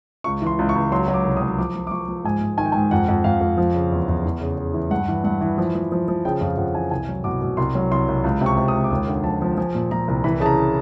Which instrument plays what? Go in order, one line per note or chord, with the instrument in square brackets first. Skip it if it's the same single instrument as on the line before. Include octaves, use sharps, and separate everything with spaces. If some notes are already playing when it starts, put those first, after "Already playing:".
[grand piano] C#2 C#6
E3 C6
C#2
C#6
C#2
F#3 C6
F#3
D6
C2
D#6
F#3
F3 D6
F3
D6
F3 C#6
F3
G#2 G#5
G#2
D#3 G#5
G5
G#2 G#5
F2 F#5
F2
F2 F5
F2
F3
C#3
E2
E2
E3
C#3
C#3
E3
G2 F#5
E3
G2 F#5
E3
F3
F3
F3
F3
C#3 G5
F2 F5
F2 F#5
E3 G#5
C2 G#5
F#3
B2 D6
B2
C2 C6
F#3
C2 C6
C2
C#2
C3
C#6
C3
D#6
C#2
D6
D#2 D#6
D3
F3 A5
F3
F3 G#5
A#2
F3 A#5
C2
E3 B5
C#3 A5
A#5